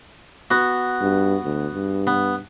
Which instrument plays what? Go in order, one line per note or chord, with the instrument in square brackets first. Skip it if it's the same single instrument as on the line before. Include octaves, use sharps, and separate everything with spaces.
[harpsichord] B3 F#4
[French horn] G2
D2
G2
[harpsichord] B3